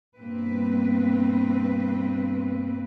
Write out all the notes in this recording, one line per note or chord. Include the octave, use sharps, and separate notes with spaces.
G2 B2 A#3 C4 B4